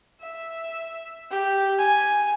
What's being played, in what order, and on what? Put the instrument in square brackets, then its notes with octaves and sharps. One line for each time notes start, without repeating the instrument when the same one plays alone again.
[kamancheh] E5
G4
G#5